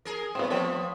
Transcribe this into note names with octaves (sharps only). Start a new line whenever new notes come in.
G#4 A#4
A2 B3 C4
F3 A3 B3 C4 C#5